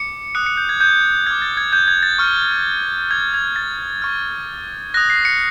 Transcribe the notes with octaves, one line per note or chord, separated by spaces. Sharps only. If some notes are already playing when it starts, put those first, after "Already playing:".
Already playing: D6 C#7
D#6 F#6 C#7
C#7
G6
G#6
G6
D6 F6 G#6
A6
G#6
G6
G#6
A6
C#6 F6
D#6 G6 G#6
G#6
A6
C#6 F6
D#6 F#6 A#6
C7
C#7